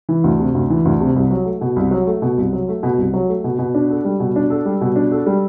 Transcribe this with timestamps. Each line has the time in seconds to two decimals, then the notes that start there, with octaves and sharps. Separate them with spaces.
0.09 E3
0.24 D2
0.39 C3
0.55 D2
0.70 E3
0.85 D2
1.01 C3
1.16 C2
1.31 F#3
1.45 A3
1.61 B2
1.76 C2
1.91 F#3
2.07 A3
2.22 B2
2.37 C2
2.53 F#3
2.68 A3
2.83 B2
2.98 C2
3.14 F#3
3.28 A3
3.44 B2
3.59 B2
3.75 D4
3.90 A4
4.05 G3
4.20 B2
4.36 D4
4.50 A4
4.65 G3
4.81 B2
4.96 D4
5.12 A4
5.26 G3